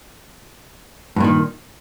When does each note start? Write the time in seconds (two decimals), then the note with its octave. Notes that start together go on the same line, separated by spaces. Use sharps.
1.16 G2
1.20 A#2
1.24 D#3